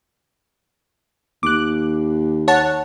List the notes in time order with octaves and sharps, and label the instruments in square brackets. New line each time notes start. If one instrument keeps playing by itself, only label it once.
[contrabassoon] D#2 [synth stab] D6 F#6
[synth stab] C#5 F#5 A5